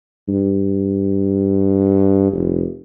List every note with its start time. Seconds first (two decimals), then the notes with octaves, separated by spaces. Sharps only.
0.29 G2
2.33 F1